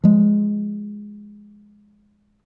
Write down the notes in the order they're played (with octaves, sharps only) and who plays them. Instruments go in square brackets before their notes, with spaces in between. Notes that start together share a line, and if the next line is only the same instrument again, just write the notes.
[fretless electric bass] F3 G#3